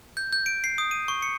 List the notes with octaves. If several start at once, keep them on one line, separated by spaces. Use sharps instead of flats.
G6
G6
D7
C7
D#6
D#7
C#6
C#7